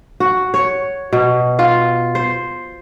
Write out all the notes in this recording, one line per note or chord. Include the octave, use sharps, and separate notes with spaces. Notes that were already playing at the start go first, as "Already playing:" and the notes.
F#4
C#5
B2
F4
C5